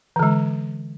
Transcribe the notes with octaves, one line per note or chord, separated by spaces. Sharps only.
D3 E3 G#3